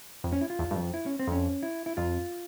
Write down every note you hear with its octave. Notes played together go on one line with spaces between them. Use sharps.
F2
C#4
E4
F4
E2
G2
F2
E4
C#4
C4
F2 C#4
E4
E4
F2 F4